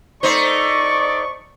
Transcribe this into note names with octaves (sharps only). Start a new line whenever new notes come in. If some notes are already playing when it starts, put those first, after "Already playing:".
A3 D#4 C5 D5 C#6